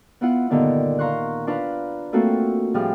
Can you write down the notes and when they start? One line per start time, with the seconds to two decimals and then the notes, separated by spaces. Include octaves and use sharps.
0.21 B3 E4 F4 F#5
0.50 G2 A#2 D3 D#3 B3 D4
0.99 F5 A#5 C6 C#6 F#6
1.47 D4 F4 B4 F5 A#5
2.13 A3 A#3 C4 F4 F#4 A4
2.74 A2 F3 G3 G4 G#4 F6